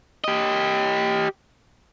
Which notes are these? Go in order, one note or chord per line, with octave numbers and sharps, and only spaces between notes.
G4 D#5